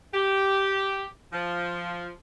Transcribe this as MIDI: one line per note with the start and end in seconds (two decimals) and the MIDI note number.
0.14 1.05 67
1.32 2.09 53